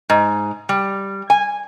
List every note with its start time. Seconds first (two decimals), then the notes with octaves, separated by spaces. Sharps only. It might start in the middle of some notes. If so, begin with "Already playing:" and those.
0.10 G#2
0.69 G3
1.30 G#5